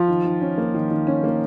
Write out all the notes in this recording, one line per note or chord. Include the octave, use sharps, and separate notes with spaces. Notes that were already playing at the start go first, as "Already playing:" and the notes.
Already playing: F3 F4
D#3
D#3
C#4
A#3
D#3
D#3
C#4
A#3